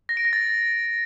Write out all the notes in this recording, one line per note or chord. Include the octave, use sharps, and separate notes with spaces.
A#6
D7
A#6
A6